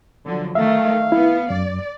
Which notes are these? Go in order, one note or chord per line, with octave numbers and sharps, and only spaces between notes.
D3 F3 F#3
D#3 A3 E5 F5
B3 E4
F#2 D5